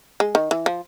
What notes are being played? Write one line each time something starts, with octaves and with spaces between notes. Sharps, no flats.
G#3
D#3
E3
F3